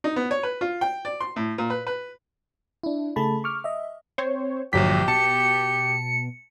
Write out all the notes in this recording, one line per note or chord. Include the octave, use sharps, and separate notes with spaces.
D#4
B3
C#5
B4
F4
G5
D5
C6
A2
A#2
B4
B4
D4 E4
C#3 A3 G#4 A5 B5
C#6 D6 F6
D#5 E5
C4 C5 C#5
A#1 G2 D3 F3 F#3 G4 B6
B2 A5 C#7